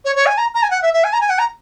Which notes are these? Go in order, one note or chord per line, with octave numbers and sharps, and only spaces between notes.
C#5
C#5
G#5
A#5
A#5
G#5
F#5
E5
E5
G#5
A#5
G#5
F#5
A#5